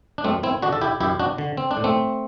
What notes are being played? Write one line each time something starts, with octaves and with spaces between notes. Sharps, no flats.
D4
F#2 A3 C4
C4 E4
D3 D4 F#4
A4
E4 G4
F#2 E4 G4
D4 F#4
D3
C4
D4
A2
A3 C4